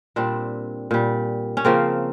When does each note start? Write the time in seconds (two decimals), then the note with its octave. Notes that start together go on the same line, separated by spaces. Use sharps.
0.16 A#2 G3 C4 D4
0.91 A#2 G3
1.57 C#4
1.65 C#3 F3 A#3 C4